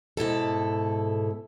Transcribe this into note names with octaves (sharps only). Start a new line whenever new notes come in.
G#2 B2 E4 A4